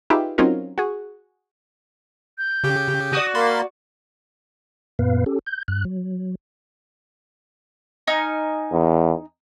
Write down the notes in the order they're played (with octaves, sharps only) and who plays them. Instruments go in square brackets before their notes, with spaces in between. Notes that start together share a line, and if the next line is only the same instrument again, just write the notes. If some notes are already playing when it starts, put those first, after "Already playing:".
[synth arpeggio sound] D#4 F4 G4 G#4 B4 E5
F#3 C4 C#4 D#4 F4 A#4
F#4 G#4
[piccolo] G6
[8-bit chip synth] C#3 G4
[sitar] F#4 D5 [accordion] D#6
[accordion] A#3 [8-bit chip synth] B5 C6 A6
[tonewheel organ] F#2 A#2 B3 B4 F5
C#4 G4 A4
G6
G2 F#6
F#3
[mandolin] D#4 G#5 F6
[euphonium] E2